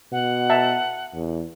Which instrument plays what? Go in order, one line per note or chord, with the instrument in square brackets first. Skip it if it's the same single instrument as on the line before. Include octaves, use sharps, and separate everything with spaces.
[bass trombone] B2 [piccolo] F#5
[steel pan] E5 A5 A#5
[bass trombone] E2